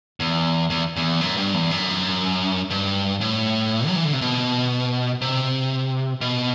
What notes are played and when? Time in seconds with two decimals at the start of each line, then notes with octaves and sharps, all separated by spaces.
0.20 E2
0.70 E2
0.96 E2
1.21 F#2
1.37 G2
1.54 E2
1.71 F#2
2.70 G2
3.21 A2
3.88 F#3
3.96 E3
4.05 D3
4.13 C3
4.21 B2
5.22 C3
6.21 B2